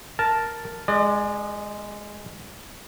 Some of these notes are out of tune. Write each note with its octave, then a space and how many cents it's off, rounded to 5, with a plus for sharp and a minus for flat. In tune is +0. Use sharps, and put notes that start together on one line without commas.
A#4 +0 A5 +0
G#3 +0 D5 +40